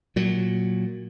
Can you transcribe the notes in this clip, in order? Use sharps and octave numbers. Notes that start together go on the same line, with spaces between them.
A#2 F#3